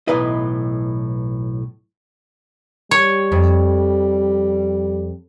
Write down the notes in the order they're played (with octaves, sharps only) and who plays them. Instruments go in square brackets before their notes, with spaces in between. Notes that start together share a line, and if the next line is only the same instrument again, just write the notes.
[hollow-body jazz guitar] B1 A2 E3 B4 D#5
[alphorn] G3 [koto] C#5
[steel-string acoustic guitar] F2